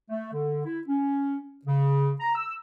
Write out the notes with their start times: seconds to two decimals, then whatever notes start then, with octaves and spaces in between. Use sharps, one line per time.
0.10 A3
0.33 D3
0.65 E4
0.86 C#4
1.66 C#3
2.20 A#5
2.35 E6